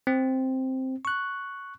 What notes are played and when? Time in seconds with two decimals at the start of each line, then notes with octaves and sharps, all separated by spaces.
0.07 C4
1.05 C#6 F#6